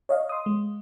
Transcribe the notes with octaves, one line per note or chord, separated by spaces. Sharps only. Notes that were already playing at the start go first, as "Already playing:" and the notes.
C#5 D#5 F5
C6 D#6
G#3